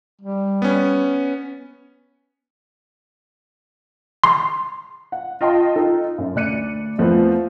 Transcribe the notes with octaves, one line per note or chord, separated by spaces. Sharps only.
G3
B3 C#4
C6
F#5
F4 D#5 G5 A5 C6
D#4 F4 A4
F#2
D2 D5 F#6 C#7 D#7
E2 F3 A3 B3 C4